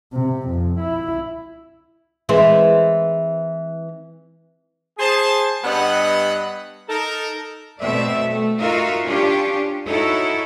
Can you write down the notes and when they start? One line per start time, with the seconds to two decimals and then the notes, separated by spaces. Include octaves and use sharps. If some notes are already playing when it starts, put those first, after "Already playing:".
0.13 C3
0.49 F2
0.80 E4
2.29 E3 G#3 C4
4.98 G#4 C5 A5
5.63 G2 G3 B3 D#5 F#5 B5
6.88 D#4 A4 A#4
7.80 B2 A3 C4 D5 E5
8.27 A3
8.59 D#4 F4 F#4 A#4 E5 F5
9.04 C#4 D4 F4 G4
9.86 D#4 E4 F#4 A4 C#5